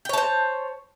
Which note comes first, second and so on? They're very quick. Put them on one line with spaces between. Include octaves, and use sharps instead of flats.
G5 C#5 A5 C5